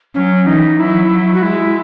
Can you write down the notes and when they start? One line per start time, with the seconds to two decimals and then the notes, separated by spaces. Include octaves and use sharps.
0.14 F#3 C#4
0.47 E3 D#4
0.79 F#3 E4
1.11 F#3
1.34 F#4
1.42 G#3 E4